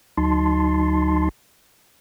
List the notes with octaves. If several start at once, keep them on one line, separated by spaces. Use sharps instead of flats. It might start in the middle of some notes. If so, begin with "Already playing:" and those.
D2 F#3 D#4 A5 C6